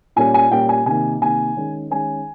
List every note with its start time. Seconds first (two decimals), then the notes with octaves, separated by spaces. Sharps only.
0.16 A#2 G3 A#3 C#4 G#5
0.34 G#5
0.51 A#2 G3 A#3 C#4 G5
0.69 G#5
0.86 C3 D#3 A#3 G#5
1.21 C3 D#3 A#3 G#5
1.57 D#3 G#3 C#4
1.91 D#3 G#3 C#4 G#5